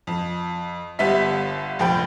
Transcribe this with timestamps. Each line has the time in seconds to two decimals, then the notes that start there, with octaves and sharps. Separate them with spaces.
0.07 F2
0.99 G1 G3 B3 E5 B6
1.79 F1 A#1 F3 G5 B5 G6